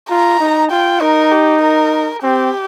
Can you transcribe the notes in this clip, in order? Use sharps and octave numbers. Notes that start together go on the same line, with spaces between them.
F4 A#5
D#4
F4 G5
D#4 A#4
G4
A#4
C4 G4